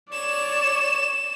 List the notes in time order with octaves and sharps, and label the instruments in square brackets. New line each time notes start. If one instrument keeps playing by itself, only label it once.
[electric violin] C#5 D5 [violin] E7